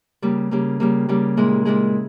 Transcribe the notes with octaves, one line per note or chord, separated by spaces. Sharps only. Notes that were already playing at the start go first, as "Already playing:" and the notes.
C#3 G3 A#3
C#3 G3 A#3
C#3 G3 A#3
C#3 G3 A#3
A#2 G#3 E4 G#4
A#2 G#3 E4 G#4